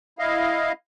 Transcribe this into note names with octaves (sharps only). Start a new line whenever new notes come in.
E4 D#5 F5